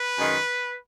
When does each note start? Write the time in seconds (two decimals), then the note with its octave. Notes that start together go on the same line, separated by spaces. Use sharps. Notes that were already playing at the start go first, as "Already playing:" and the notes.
Already playing: B4
0.18 F#2 D#3 G#3